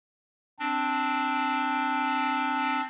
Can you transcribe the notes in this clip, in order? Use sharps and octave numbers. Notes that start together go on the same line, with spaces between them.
C4 D4